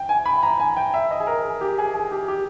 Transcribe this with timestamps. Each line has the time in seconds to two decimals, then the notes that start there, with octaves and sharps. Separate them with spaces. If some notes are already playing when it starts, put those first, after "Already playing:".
Already playing: G5
0.09 G#5
0.26 B5
0.43 A#5
0.60 G#5
0.76 G5
0.94 E5
1.11 D#5
1.20 G#4
1.27 A#4
1.44 G#4
1.61 G4
1.78 G#4
1.94 G#4
2.12 G4
2.28 G4